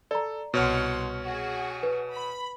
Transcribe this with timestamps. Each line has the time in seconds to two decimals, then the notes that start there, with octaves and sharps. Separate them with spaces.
0.11 A4 D5 A#5
0.54 C2 B2 C#5 F#5 C6 F6
1.24 F#4 G#4
1.83 B4
2.14 B5